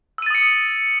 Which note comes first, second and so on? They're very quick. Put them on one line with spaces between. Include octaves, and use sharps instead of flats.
E6 D#7 A6 D#6 C#7